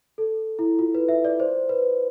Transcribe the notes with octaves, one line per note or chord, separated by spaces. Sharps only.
A4
E4
F4
B4
E5
D5
C5
B4